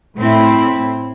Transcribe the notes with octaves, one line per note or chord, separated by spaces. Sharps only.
A2 C4 E4